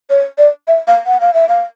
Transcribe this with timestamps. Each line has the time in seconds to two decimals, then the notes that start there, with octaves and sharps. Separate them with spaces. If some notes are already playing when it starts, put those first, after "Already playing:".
0.10 C#5
0.38 D5
0.68 E5
0.87 F5
1.06 F#5
1.21 F5
1.34 E5
1.49 F5